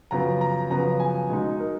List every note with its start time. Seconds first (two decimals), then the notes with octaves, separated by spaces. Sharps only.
0.11 F#2 C#3 F3 B3 A#5
0.41 A#5
0.70 F#2 C#3 F3 B3 A#5
1.00 G#5
1.29 B2 G#3 D#4
1.59 A#4